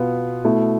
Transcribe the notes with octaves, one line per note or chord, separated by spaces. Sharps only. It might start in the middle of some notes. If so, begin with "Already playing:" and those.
Already playing: B2 B3 F4 B4
B2 A3 E4